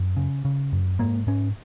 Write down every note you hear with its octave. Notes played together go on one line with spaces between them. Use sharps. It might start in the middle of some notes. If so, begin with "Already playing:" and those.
Already playing: F#2
C#3
C#3
F#2
G#2 A#3
G#2 C#4